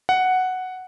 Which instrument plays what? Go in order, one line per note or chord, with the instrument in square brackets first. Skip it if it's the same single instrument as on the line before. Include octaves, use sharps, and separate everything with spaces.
[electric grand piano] F#5